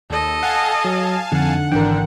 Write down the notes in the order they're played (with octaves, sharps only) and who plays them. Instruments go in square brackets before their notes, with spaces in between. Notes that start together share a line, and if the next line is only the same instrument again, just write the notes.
[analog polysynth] D#2 [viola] A4 D#5
[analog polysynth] F5 G#5 A5 [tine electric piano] F#5
[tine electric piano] F#3
[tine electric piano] F2 [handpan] D3 D#4 [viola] F#5
[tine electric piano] G#1 G5 [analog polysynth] D3 D4 [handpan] E3 A#4